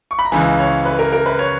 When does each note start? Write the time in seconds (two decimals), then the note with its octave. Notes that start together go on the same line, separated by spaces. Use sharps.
0.11 C#6
0.19 B5
0.25 A#5
0.32 C#2 C#3 E3 G#5
0.59 C#5
0.85 B4
0.99 A#4
1.13 A#4
1.26 B4
1.39 C#5